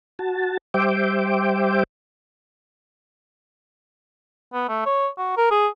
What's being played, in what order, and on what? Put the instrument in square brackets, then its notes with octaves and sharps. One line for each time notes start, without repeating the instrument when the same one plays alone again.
[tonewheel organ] F#4 A5
G3 C5 E5 G5 D6
[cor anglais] B3
A3
C#5
F#4
A#4
G#4